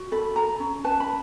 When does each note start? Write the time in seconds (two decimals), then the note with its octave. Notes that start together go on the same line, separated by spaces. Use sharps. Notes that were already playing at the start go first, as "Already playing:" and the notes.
Already playing: F#4
0.12 A4 B5
0.36 A4 A#5
0.60 C#4
0.84 B4 A5
1.00 B5